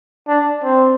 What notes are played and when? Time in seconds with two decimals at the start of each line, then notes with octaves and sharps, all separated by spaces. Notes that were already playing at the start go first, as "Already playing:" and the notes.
0.28 D4
0.63 C4